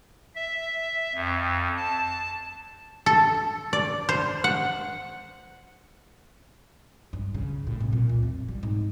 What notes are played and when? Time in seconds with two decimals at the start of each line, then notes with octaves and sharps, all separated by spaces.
0.35 E5
1.15 F2
1.77 A5
3.06 A4
3.73 D5
4.09 C5
4.44 F#5
7.13 G2
7.34 C#3
7.67 A2
7.80 C2
7.93 A#2
8.09 A3
8.23 F2
8.48 G3
8.63 G#2